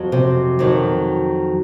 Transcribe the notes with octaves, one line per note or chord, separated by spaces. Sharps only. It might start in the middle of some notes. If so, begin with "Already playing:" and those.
Already playing: F2 F#3
C3 C4
F2 D#3 F#3